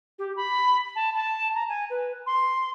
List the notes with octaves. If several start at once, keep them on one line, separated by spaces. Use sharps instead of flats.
G4
B5
A5
A5
A#5
G#5
B4
C6